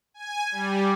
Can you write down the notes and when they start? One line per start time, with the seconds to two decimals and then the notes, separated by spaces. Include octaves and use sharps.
0.14 G#5
0.52 G3